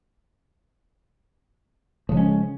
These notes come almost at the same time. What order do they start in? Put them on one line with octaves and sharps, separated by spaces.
F3 C#3 G#3 C#4